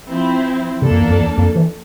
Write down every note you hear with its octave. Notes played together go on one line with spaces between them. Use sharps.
F3 C4 E4
C3 F3 A#3 D4 A4
F2
E2
F2
E2
F2
E3